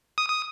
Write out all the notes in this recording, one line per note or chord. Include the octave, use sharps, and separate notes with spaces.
D#6
D#6